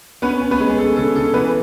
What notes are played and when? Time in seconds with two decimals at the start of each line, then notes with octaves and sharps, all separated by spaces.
0.22 B3 C#4 B4
0.42 C#4
0.51 B3 B4
0.60 G#3
0.69 G#4
0.78 C#4 A4
0.96 C#3 A4
1.15 C#3 A4
1.34 E3 B3 B4